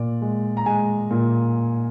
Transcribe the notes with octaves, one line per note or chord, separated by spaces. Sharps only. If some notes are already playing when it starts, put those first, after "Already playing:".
Already playing: A#2 D5
G#3
A#5
G#3 G#5
A#2